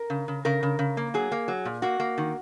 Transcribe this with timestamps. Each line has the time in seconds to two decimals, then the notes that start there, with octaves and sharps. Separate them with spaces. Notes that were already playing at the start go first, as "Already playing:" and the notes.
Already playing: A#4
0.10 C#3
0.28 C#3
0.45 C#3 A#4
0.63 C#3
0.79 C#3
0.97 A#3
1.14 F#3 G#4
1.32 A#3
1.48 F#3
1.65 A#2
1.82 A#3 F#4
2.00 A#3
2.18 D#3